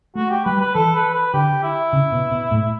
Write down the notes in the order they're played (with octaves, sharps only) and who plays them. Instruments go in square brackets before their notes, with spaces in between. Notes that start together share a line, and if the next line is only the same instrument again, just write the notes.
[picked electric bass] A3 [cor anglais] F#4
[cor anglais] G4
[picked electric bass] G3 [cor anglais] B4
[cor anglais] B4
[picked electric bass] E3 [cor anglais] A4
[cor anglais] B4
B4
[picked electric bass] D3 [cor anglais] G4
[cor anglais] E4
[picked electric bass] C#3
B2
B2
A2